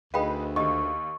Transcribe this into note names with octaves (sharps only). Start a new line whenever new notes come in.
D2 D#4 G#4 B4 F5 G5 B5
D#2 G4 D#5 C#6